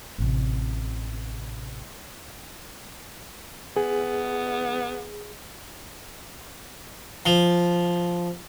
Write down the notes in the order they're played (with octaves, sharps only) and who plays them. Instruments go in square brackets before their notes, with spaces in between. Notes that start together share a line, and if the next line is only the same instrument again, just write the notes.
[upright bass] A1 C3
[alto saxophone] B3 [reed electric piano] G#4
[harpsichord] F3